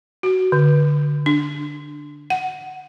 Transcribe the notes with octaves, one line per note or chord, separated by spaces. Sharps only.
F#4
D3
D4
F#5